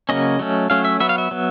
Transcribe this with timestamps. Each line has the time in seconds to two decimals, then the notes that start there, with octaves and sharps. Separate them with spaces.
0.09 C#3 F#3 A#3 C#4 D#5
0.39 F#3 A3 C#4
0.70 F#3 A3 C#4 F5
0.85 E5
1.00 F#3 B3 E5
1.09 F5
1.18 E5
1.31 F#3 B3